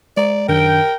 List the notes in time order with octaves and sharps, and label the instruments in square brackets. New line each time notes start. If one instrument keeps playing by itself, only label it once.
[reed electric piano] G#3 A#5 [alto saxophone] D5
[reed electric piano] F#2 D#3 D4 [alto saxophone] A#4 [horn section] G5